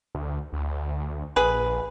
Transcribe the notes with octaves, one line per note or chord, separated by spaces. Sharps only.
D2
D2
A#1 G#4 B4